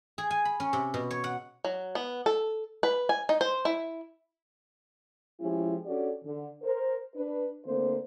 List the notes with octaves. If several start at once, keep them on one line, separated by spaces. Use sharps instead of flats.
G#4
G#5
B5
C#4
C3
B2
C#5
F#5
F#3
B3
A4
B4
G#5
D#4
C5
E4
F3 G#3 C#4 E4 G4
C#4 D4 F#4 G4 A4 D5
D3
A#4 C5
D4 B4
D3 A3 A#3 C4 C5